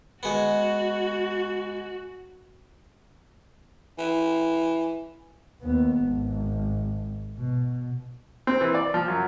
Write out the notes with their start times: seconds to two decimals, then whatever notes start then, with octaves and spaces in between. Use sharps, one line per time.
0.23 G#3 B3 F#4
3.99 E3
5.62 D#2 B3
6.02 G#1
7.38 B2
8.47 C4
8.61 E3
8.75 D5
8.94 F3
9.08 F#2